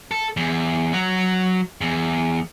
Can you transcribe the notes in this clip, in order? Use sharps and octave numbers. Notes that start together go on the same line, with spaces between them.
A4
E2
F#3
E2